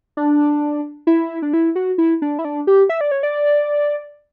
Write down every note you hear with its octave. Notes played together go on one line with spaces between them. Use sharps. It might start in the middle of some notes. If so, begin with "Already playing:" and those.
D4
E4
D4
E4
F#4
E4
D4
E4
D4
G4
E5
D5
C#5
D5